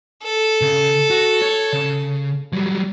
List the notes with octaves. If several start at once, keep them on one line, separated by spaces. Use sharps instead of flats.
A4
C#3
F#4
C#5
C#3
F#3 G3